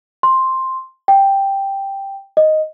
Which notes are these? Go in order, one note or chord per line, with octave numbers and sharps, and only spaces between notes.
C6
G5
D#5